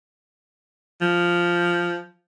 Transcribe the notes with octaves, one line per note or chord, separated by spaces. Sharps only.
F3